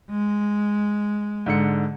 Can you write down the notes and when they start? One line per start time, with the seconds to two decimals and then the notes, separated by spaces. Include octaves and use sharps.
0.10 G#3
1.46 G#2 D3 C#7